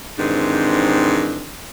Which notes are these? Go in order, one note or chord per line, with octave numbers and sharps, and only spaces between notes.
G#2 C3 D#3 E3 C4 D4